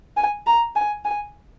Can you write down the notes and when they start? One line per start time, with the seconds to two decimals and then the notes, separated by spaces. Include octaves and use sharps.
0.17 G#5
0.47 A#5
0.75 G#5
1.05 G#5